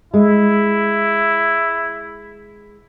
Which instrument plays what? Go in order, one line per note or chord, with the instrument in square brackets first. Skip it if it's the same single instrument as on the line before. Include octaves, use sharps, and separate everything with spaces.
[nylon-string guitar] G#3 [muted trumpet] E4